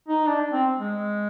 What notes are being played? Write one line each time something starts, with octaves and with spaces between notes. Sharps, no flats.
D#4
D4
C4
G#3